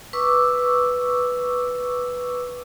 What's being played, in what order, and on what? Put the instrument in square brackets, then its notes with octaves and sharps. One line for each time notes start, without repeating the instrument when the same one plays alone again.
[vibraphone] B4 C#6 D6 E6